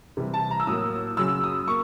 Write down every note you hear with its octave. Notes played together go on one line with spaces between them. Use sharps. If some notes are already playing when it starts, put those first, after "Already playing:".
C3 E3 G3
A5
A#5
E6
A2 F#3 A#3 D#6
F#2 C#3 F#3 E6
D#6
A#3 C#6